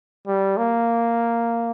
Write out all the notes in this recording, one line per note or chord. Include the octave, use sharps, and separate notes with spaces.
G3
A#3